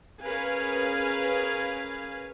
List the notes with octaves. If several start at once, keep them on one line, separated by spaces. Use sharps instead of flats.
C#4 G#4 A#4 B4 F5 G#5